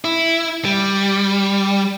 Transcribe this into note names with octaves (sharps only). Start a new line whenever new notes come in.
E4
G3